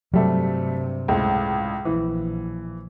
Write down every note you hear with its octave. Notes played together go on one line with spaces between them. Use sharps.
G2 C3 F#3 G3 A3
C#2 A2 G#3
A#1 E3